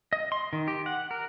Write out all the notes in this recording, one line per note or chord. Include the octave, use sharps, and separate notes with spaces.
D#5
C6
D#3
G4
F#5
A#4